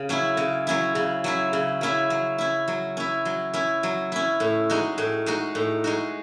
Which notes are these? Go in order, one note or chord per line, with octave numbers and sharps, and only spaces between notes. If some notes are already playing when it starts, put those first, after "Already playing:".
Already playing: C#3
F#3 C#4 E4
C#3
F#3 C#4 E4
C#3
F#3 C#4 E4
C#3
F#3 C#4 E4
F#3
C#4 E4
F#3
C#4 E4
F#3
C#4 E4
F#3
C#4 E4
A2
G#3 D#4 F#4
A2
G#3 D#4 F#4
A2
G#3 D#4 F#4